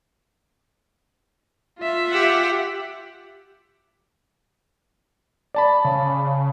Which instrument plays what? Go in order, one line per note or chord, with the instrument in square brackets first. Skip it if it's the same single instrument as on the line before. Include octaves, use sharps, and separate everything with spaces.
[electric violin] F4 E5
[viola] G4 F#5
[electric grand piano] D5 A5 B5
[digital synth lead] C#3